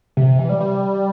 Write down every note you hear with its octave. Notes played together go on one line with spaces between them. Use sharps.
C3
C3
E3
G3
G3